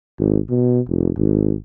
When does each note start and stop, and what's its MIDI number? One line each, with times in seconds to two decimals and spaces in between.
0.19 0.38 32
0.50 0.80 47
0.88 1.10 29
1.17 1.55 32